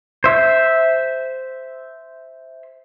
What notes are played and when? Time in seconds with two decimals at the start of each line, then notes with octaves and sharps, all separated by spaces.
0.24 C5 E5